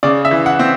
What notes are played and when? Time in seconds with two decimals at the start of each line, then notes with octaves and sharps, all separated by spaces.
0.03 C#3 D5
0.25 E5
0.31 E3
0.46 F#5
0.59 C4